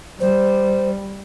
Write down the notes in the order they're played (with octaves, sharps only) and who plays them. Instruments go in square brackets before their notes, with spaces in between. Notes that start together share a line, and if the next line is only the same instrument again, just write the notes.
[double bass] G3 [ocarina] C5